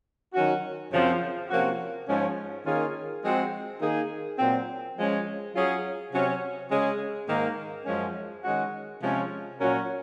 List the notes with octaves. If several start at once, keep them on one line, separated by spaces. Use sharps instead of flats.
D#3 F#3 C#4 F#4
F#2 C#3 F3 C4
C3 F3 A#3 C#4 F#4
G#2 F3 G#3 C#4
D#3 A#3 C#4 F4 G#4
F3 G#3 C4 F#4
D#3 A#3 D#4 G#4
A#2 F#3 C4
F3 G#3 C#4
F#3 C#4 F4 G#4
C3 F#3 C#4
C#3 G#3 C#4 G#4
G#2 D#3 A#3
F#2 F3 G#3 C#4
D#3 G#3 C#4 F#4
C3 F3 G#3 C#4
A#2 F#3 C#4 F#4 A#4